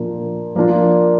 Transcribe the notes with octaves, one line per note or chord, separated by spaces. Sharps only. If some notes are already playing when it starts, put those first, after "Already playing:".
Already playing: A#2 F3 A#3 D4
F3 A#3 D4 F4